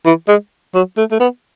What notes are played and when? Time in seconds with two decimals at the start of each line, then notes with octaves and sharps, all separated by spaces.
0.06 E3
0.28 G#3
0.75 F#3
0.97 A3
1.11 A3
1.20 B3